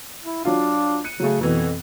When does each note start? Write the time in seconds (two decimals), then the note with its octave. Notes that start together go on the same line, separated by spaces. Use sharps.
0.25 E4
0.45 F#3 D4 F4
1.04 F#6 C#7 D#7
1.20 C#3 F#3 A3
1.41 F2 B2 E3